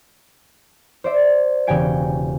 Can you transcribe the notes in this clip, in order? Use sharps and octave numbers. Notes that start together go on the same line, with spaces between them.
C5 D5 E5
E1 C#3 G4 G5 G#5 D7